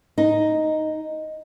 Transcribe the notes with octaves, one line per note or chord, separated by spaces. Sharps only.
D#4